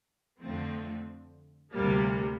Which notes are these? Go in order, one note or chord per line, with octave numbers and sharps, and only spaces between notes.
F2 D3 F3 A3 C4
D2 C3 G3 A#3